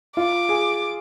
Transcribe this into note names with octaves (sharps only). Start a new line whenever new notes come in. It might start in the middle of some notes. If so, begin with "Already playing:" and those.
F4 D6
G#4